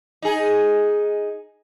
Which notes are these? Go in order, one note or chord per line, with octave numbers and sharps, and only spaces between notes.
D#4 G#4